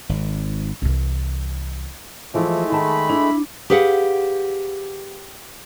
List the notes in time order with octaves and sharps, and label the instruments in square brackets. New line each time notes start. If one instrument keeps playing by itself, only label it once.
[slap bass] G#1
[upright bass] C2 E3
[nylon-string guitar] E3 F3 [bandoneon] G#3 A3
[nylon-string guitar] D#3 A5 [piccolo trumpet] B5
[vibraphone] D4 [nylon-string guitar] E4
[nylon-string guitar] G4 G#4 B4 F5 F#5